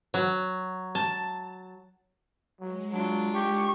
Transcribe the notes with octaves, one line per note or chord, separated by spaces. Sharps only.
F#3
A5
F#3 G#3
F#3 D4 F4
G4 C#6